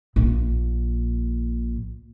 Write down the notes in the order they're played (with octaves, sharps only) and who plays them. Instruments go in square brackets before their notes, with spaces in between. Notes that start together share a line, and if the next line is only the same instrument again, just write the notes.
[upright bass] A#1 A#2